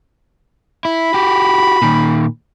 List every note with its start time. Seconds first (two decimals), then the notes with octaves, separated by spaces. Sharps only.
0.85 E4 B5
1.14 F#4 G4
1.82 A#2 D#3